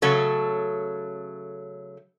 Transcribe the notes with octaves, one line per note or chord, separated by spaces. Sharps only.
C#3 F#3 A3 C#4 A4